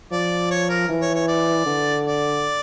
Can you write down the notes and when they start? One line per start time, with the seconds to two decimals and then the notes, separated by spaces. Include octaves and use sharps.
0.12 F3 D5
0.50 C#5
0.69 A#4
0.89 E3
1.02 C#5
1.15 C#5
1.28 D5
1.66 D3
2.06 D5